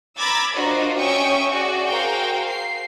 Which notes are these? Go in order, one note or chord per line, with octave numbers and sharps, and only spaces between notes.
A#5 B5 D6 E6 G#6 A6
D4 F4 F#4 A#4 C5 D#5
C#4 E5 G5 C#6 D#6 E6
F#4 G#4 D5
F#4 G#4 A#4 C5 F5 G5
C7